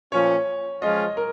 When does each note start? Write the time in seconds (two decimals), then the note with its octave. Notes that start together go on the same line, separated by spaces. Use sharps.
0.12 A#2 F3 C#4 C#5
0.82 F3 G#3 C#4 F4 D#5
1.17 A#4